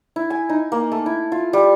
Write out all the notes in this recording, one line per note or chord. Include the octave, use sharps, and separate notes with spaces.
E4
G#5
D#4
A#3
A3
E4
F4
G3